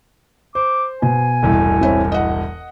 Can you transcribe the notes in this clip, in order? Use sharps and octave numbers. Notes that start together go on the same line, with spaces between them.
C5 D6
B2 G#5
E1 C2 A2
C4 E4 C#5
D#5 F#5